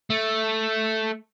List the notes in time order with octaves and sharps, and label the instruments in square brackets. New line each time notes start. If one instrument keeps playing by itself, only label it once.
[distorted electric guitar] A3